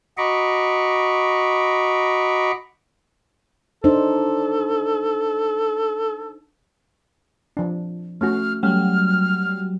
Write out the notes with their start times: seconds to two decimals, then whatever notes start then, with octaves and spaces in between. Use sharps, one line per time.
0.18 F#4 D#5 A#5 B5 C#6 D6
3.84 D4 D#4 A4 C5
7.57 F3 D4
8.21 A3 C#4 F#4 F6
8.63 F#3 G3 A3 C#4 F6